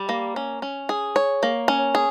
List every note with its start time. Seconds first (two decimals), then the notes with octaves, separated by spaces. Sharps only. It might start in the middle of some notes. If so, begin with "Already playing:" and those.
Already playing: G3
0.09 A#3
0.36 C#4
0.62 C#4
0.89 G#4
1.16 C#5
1.43 A#3
1.68 C#4
1.95 G#4